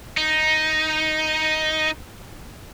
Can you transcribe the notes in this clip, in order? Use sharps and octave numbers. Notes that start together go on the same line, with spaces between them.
D#4